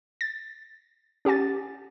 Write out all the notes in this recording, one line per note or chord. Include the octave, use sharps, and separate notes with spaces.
A6
C#4 G4 F#5 G#5 A6